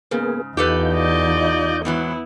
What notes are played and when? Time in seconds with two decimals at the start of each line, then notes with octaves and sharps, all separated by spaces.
0.11 G#2 C#3 A#3 B3 G#4
0.57 E2 D#4 F4 G4 A4 B4 G6
0.94 D5 D#5
1.85 G#2 E3 F#3 B3 E4